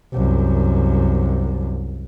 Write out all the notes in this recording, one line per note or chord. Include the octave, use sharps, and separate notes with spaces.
C2 F#2